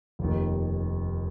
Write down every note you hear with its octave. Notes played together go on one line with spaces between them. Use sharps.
F1 D#2 D#3